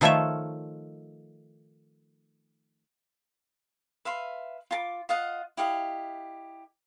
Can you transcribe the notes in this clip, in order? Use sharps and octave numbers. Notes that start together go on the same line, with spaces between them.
D#3 F3 A3 F4 C#5 E5
B4 E5 F5 C6
F4 A5 D6
F4 D#5 F5 F#5
E4 G4 D#5 F5